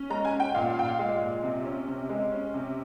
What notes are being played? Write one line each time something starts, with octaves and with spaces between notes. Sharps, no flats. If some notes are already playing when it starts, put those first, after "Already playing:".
Already playing: C#4
G#3 A#5
G#5
C#4
G5
A#2 F5
F5
A#2 G5
F5
G#3
A#2
C3
C#4
C3
G#3
C#4
C3